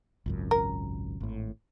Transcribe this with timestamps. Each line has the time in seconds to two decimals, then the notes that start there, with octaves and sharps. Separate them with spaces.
0.26 G#1 C#2 F#2
0.51 A#4
1.20 G#1 A2